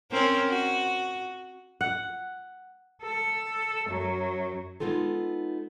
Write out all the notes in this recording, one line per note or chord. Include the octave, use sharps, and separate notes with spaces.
C4 C#4 A#4
F#4
F#5
A4
F#2 F#3
G#3 A3 B3 D#4 F4 A4